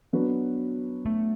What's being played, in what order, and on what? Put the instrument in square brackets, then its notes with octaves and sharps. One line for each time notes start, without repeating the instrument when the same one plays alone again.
[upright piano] F#3 B3 D4 F#4 B4
[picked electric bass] A3